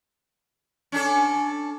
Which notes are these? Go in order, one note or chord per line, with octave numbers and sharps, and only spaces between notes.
C#4 D4 A4